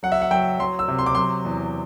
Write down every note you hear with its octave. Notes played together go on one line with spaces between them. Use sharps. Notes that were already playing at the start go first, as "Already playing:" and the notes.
F#3 F#5
E5
F#5
F#3 G5
F#3 C6
E6
C3
C6
D6
F#3 C6
E2